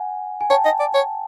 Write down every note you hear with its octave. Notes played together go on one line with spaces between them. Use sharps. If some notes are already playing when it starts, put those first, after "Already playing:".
Already playing: F#5 G#5
G#5
C#5 G5 A5
D#5
D5
C#5